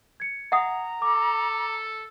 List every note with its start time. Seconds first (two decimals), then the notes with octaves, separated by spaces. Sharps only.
0.20 G#6 C#7
0.52 E5 F#5 A#5 D#6
1.02 A4 D6